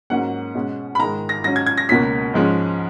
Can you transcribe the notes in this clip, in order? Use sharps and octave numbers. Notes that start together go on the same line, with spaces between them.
G#2 F#3 A#3 C#4 F#5
B2 G#3 C#4
B5
G#2 D#3 G#3 A#5
A#6
G#2 F#3 C#4 A#6
G#6
G#6
A#6
C#2 B2 A#3 C#4 B6
G#2 F3 G#3 C#4